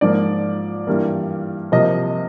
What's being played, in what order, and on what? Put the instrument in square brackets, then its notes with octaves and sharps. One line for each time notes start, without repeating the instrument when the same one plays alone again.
[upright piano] G#2 F3 A#3 D5
G2 E3 G3 A#3
C3 F3 A#3 D#5